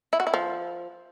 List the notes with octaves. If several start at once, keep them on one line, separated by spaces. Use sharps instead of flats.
E4
F#4
E4
F3